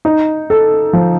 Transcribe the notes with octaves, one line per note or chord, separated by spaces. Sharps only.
D#4
A4
F3